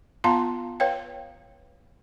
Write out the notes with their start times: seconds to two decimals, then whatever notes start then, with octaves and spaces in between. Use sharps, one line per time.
0.24 B3 F4 F5 A5 A#5 C6
0.80 B4 C#5 F5 G5